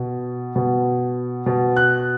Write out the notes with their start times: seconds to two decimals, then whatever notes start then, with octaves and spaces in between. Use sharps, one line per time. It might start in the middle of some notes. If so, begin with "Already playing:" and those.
Already playing: B2
0.56 B2
1.46 B2
1.76 F#6